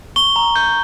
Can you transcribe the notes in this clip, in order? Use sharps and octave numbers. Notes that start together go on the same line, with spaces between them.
C#6 G7
A#5
G6